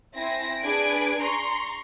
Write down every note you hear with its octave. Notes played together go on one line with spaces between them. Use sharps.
C4 E4 G#5 A#6
D4 G#4 B4 G#6 D7
A#5 C6 C#6